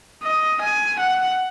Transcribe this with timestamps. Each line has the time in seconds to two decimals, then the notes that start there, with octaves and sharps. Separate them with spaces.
0.23 D#5
0.61 G#5
0.99 F#5